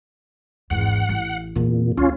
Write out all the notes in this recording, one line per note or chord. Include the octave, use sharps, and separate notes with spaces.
G#1 E2 F#5
A1
E2 A#2 C4
D2 C#4 F4